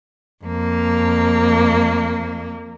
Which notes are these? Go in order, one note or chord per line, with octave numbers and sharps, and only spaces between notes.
F2 A#3